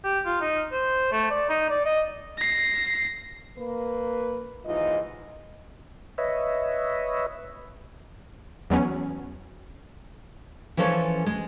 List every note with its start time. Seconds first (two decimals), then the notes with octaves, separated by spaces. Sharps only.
0.04 G4
0.25 F4
0.41 D#4
0.71 C5
1.12 A3
1.30 D5
1.49 D#4
1.69 D5
1.85 D#5
2.38 A#6 C7
3.58 A#3 B4
4.65 D#2 G#2 E3 D#4 F4 D#5
6.18 B4 C#5 D#5 E5
8.70 E2 F#3 B3 C#4
10.77 E3 F3 C#4 A4 C5 C#5
11.26 G#3